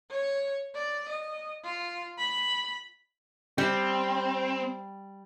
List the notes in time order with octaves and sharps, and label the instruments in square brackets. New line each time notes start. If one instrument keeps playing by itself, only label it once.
[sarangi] C#5
D5
D#5
F4
B5
[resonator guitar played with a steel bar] G3 [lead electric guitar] C4